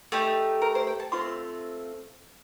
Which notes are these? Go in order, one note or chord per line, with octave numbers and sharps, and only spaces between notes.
A3 D#4 G4
A#4
C5
G5
A5
A3 C4 F4 C6